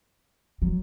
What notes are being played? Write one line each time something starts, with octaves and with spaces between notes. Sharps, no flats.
F#3